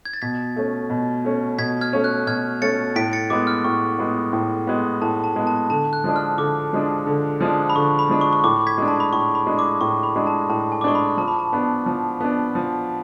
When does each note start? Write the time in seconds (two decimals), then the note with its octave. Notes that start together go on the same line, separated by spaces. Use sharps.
0.05 G#6
0.13 A6
0.22 B2 G#6 B6
0.56 A3 C#4
0.90 B2
1.25 A3 C#4
1.58 B2 G#6 B6
1.81 F6 G#6
1.93 A3 C#4
2.04 F#6
2.27 B2 F6 G#6
2.62 A3 C#4 A6 C#7
2.96 A2 B6 D7
3.13 A6 C#7
3.30 G#3 B3 D6
3.47 F6
3.64 A2 C#6
3.99 G#3 B3
4.33 A2
4.67 G#3 B3
5.02 A2 A5
5.24 A5
5.36 G#3 B3
5.47 A5
5.70 D3 A5
5.93 F#6
6.04 F3 G#3 D4
6.16 F6
6.38 D3 D6
6.73 F3 G#3 D4
7.07 D3
7.41 F3 G#3 D4
7.70 B5
7.75 D3 C#6
7.99 B5
8.10 F3 G#3 D4
8.21 C#6
8.33 C#6
8.44 A2 D6
8.67 G#6 B6
8.78 G#3 D4
8.88 A5
9.00 B5
9.13 A2 C#6
9.35 B5
9.47 G#3 D4
9.59 D6
9.81 A2 C#6
10.03 B5
10.16 G#3 D4
10.27 A5
10.49 A2 A5
10.72 G#5
10.81 D6
10.84 G#3 D4 C#6
10.95 B5
11.17 F3 A5
11.28 B5
11.39 A5
11.53 B3 D4
11.86 F3
12.20 B3 D4
12.55 F3